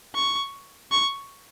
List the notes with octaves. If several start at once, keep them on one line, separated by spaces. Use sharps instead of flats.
C#6
C#6